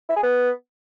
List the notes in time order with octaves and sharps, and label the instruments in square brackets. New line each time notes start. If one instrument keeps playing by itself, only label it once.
[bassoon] E4
G#4
B3